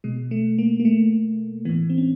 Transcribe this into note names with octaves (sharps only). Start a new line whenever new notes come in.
B2 G#3
A3
A#3
A#3
A3
A2 E3 B3
C4
C#4